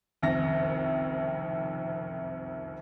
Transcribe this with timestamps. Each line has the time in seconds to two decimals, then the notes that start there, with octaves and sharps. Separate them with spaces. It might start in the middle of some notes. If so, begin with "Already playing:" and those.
0.22 F#1 C2 F2 D#3 A#6